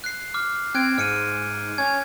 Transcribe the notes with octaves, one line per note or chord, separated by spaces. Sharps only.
F#6 C7
D6 F6
C4 F#6 G#6 D7
G#2 F6 C#7 D#7
C#4 G#6